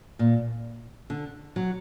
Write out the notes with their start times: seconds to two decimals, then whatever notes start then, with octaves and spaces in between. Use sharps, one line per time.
0.19 A#2
1.10 D3
1.56 F#3